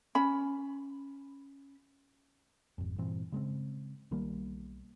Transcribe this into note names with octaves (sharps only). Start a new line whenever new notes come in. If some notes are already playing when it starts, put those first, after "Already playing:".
C#4 B5
G#1 F2
G2 A#2 E3 C4
C#3 G#3 A3 C4
B1 D#3 G3 A#3